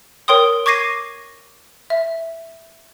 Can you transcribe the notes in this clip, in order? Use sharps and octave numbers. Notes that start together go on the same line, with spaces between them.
A#4 C#5 G5 C6 D#6
C#6 D6 G#6 A#6 C7 D#7
E5